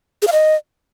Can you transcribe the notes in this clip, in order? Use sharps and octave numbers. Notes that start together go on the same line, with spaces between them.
G#4
F5
D#5